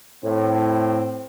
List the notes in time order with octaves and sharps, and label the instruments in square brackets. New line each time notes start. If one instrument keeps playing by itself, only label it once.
[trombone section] A2 [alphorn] C4